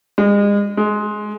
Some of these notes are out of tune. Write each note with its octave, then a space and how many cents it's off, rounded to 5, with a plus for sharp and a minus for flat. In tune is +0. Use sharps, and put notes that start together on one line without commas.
G#3 -35
G#3 +15